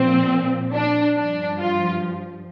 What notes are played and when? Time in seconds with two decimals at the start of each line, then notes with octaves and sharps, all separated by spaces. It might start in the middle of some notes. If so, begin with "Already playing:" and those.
Already playing: A#2 F3 C4
0.74 D4
1.16 G2 F3 D4
1.58 F4